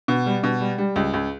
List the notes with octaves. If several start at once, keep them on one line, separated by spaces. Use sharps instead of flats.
B2
G3
B2
G3
G3
C#2
C#2